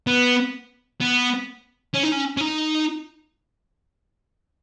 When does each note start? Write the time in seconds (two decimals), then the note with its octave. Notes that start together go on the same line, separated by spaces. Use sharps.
0.07 B3
1.01 B3
1.94 C#4
2.04 D#4
2.13 C#4
2.37 C#4
2.41 D#4